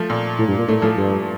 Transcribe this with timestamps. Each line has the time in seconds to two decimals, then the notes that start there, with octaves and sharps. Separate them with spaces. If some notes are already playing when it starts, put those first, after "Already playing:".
Already playing: F3 A3
0.10 A#2
0.39 A2
0.48 G2
0.58 A#2
0.68 A2 A3
0.82 A2 F3
0.97 G2